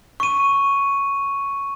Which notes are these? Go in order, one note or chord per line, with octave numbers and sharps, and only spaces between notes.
C#6 D#7